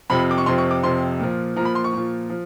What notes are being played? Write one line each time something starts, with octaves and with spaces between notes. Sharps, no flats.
F2 C3 F3 B5
D6
C#6
F2 C3 F3 C6
C#6
D6
F2 C3 F3 C6
A#2 F3
A#2 F3 A#5 B5
C6
C#6
A#2 F3
F3